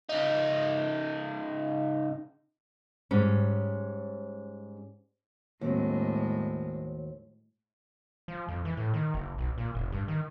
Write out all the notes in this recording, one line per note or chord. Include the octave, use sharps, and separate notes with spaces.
C#3 D#4
G#2 G3 C#4
D#2 A2 F#3 G#3 C4
F3
F2
E3
A2
D#3
F#1
B1
A#2
F1
G2
D#3